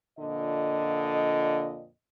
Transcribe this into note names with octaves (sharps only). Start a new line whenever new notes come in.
F2 A#2 D3 D#5